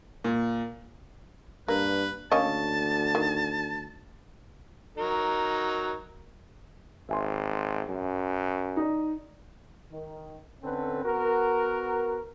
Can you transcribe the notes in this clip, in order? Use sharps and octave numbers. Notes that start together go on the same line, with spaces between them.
A#2
G2 A#3 B4
D2 A#3 C#4 D#5 A5
D#3
F#3 D#4 A#4
G#1 E5 G#5 C6
F#2
D#4 D5
D#3
D3 C4 C#4 A4 B4
B3 F#4 A#4